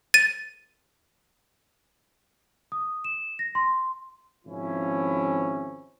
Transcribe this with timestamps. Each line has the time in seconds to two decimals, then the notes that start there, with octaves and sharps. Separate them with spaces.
0.14 A6 D#7
2.72 D#6
3.04 E7
3.39 A#6
3.55 C6
4.46 G#1 F3 C#4 E4